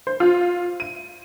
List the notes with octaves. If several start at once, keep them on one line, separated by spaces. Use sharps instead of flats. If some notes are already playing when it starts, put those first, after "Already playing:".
C5
F4
D#7